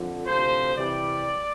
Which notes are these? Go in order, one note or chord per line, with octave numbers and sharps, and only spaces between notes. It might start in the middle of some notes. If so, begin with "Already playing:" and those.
Already playing: F2 D3
D2 C3 F3 C4 C5
C3 E3 G3 D5